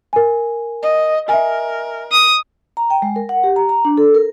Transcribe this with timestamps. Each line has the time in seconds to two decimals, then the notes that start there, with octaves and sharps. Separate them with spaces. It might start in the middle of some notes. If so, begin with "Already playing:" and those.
0.13 A#4 G#5
0.82 D#5
1.29 A#4 E5 G#5
2.12 D#6
2.77 A#5
2.90 G5
3.02 G#3
3.16 A#4
3.29 F#5
3.43 G4
3.56 A#5
3.69 A#5
3.85 D4
3.98 A4
4.14 A#4